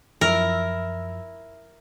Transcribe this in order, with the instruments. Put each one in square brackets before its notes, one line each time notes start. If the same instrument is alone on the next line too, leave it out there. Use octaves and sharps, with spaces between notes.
[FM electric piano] F#2 F3 E6 [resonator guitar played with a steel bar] E4 [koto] A#4